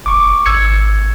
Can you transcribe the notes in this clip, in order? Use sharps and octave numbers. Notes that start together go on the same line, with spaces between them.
F#1 C#6 D6
G#1 E6 G#6 C#7